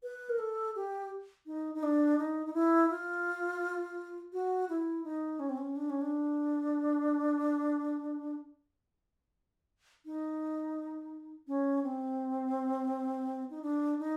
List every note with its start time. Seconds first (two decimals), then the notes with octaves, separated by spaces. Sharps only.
0.03 B4
0.29 A#4
0.39 A4
0.76 G4
1.47 D#4
1.75 D#4
1.83 D4
2.18 D#4
2.46 D#4
2.54 E4
2.90 F4
4.33 F#4
4.69 E4
5.04 D#4
5.39 C#4
5.49 C4
5.57 C#4
5.76 D4
5.89 C#4
6.02 D4
10.06 D#4
11.47 C#4
11.83 C4
13.50 D#4
13.62 D4
13.99 D#4